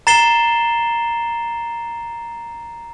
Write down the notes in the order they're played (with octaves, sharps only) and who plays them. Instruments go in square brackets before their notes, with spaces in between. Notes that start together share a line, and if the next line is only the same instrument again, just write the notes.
[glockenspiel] A#5 A6 C7 E7 G7